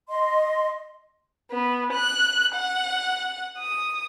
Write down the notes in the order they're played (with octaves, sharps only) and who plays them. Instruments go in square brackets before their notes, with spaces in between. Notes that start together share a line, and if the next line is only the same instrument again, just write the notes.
[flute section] D#5 C6
[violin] B3
F#6
F#5
D#6